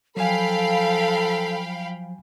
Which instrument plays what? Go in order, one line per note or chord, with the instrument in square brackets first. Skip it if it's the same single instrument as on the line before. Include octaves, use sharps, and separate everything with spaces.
[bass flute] F3 [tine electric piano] F#3 G#5 [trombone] A4 [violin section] F5 G5 B5